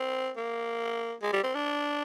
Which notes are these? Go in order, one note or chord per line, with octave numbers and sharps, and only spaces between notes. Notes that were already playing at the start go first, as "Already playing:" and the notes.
Already playing: C4
A#3
G#3
G3
C4
D4